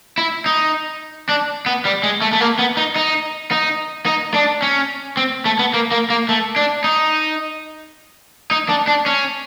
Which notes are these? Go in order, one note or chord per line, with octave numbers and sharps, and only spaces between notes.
E4
D#4
D4
B3
G3
G#3
A3
A3
A#3
B3
D#4
D#4
D#4
D#4
D4
C#4
C4
A3
B3
A#3
A#3
A#3
A3
D4
D#4
D#4
D4
D4
C#4